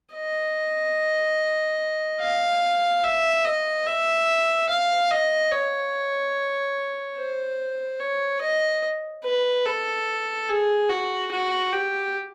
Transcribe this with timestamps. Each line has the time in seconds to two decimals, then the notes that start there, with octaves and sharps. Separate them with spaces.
0.14 D#5
2.21 F5
3.04 E5
3.45 D#5
3.87 E5
4.69 F5
5.10 D#5
5.52 C#5
7.17 C5
8.00 C#5
8.41 D#5
9.24 B4
9.65 A4
10.49 G#4
10.89 F#4
11.31 F#4
11.72 G4